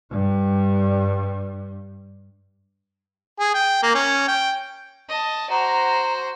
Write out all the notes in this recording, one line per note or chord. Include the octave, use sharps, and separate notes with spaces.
G2 G3
G#4
G5
A#3
C#4
G5
D#5 A5
F#4 C5 A#5